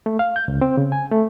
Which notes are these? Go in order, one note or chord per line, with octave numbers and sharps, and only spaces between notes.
A3
F5
G6
C#2
C4
C#3
G#5
A3